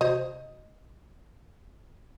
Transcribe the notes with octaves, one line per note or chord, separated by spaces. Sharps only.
C3 F#4 C5 D#5